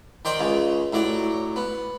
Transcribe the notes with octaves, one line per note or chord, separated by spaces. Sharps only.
D#3 C5 D5 G5
C#2 C#3
A2 F#3 D5
B3